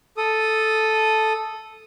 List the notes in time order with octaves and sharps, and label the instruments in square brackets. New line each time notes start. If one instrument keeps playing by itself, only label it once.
[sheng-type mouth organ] A4 D#6